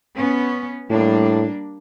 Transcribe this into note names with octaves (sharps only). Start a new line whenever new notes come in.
B3 C#4
A2 G3 A#3 D4